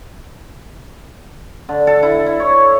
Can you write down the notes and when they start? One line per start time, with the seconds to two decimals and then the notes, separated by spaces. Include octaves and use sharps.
1.69 D3
1.87 A4
2.03 E4
2.26 E4
2.40 C#5